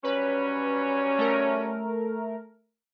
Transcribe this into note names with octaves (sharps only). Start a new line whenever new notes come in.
F#3 G3 C#4 B4
A3 A#4